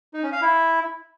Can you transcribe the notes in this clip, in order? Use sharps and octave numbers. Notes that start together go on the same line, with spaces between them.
D#4
C#4
F5
E4